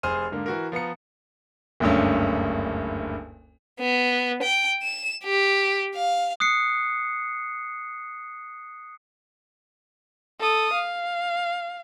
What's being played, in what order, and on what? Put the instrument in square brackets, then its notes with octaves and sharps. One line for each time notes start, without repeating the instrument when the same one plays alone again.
[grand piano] F1 G#4 C5 F6 D#7
G#2 D3 A#3
E3 F#4 A#4
F3 B3 A#5 C#7
F#1 D2 G2 C#4
[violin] B3
G5
E7
G4
F5
[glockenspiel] D#6 F#6 C7 C#7
[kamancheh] A4 D#6
F5